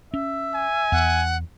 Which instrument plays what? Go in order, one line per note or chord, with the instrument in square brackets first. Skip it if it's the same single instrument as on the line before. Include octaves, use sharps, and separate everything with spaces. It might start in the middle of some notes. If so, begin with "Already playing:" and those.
[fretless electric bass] C#4 [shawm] E5
[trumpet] G#5
[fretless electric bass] E2 [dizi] F#5